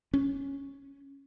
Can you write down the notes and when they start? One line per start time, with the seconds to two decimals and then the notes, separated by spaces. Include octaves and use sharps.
0.14 C#4